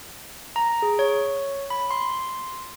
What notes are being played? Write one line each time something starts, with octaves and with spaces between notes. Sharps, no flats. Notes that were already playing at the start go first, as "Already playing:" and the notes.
A#5
G#4
C#5
B5
C6